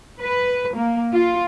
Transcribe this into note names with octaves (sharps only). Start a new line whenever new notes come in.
B4
A#3
F4